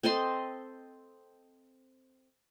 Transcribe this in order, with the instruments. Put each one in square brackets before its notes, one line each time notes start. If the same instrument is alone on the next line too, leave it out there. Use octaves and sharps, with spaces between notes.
[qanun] C4 A4 D#5 C6